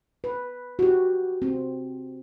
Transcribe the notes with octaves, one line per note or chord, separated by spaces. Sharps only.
B4
F#4
G4
C4